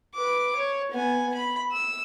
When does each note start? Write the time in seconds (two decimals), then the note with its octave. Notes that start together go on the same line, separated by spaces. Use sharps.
0.14 B4 D6
0.56 C#5
0.91 B3 G#5
1.34 B5
1.71 E6